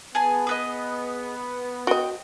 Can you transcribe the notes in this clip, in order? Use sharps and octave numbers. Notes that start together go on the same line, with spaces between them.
B3 G#4 G#5 A5
G#4 B4 D#5
F#4 D#5 G5